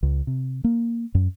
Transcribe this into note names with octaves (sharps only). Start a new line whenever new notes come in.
C#2
C3
A#3
F#2